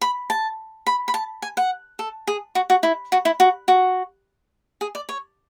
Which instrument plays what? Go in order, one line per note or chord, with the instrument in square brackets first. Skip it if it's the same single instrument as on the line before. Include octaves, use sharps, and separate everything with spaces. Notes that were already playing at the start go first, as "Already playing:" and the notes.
[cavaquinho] B5
A5
B5
B5
A5
G#5
F#5
A4
G#4
F#4
F#4
E4
F#4
E4
F#4
F#4
G#4
D5
C#5